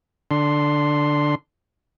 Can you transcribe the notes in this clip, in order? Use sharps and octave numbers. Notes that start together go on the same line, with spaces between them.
D3 D4 C6